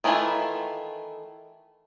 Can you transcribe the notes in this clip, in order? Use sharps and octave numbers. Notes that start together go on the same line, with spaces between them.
D#3 E3 A3 E4 F4